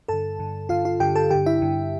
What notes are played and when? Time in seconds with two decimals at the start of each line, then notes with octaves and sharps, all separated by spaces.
0.08 G2 D3 A4 A5
0.39 G2 D3
0.69 G2 D3 F4 F5
0.85 F4 F5
1.00 G2 D3 G4 G5
1.15 A4 A5
1.31 G2 D3 G4 G5
1.46 E4 E5
1.62 G2 D3